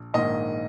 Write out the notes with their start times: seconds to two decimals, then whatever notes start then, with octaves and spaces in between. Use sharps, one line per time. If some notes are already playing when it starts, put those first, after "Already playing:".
Already playing: A#1
0.14 A#1 G#2 D#3 A#3 D#5